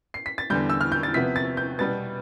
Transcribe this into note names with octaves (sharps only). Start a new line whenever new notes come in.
C7
B6
A6
E2 D3 G3 G6
E6
F6
G6
A6
C3 F3 B3 B6
A6
G6
B2 G3 B3 A6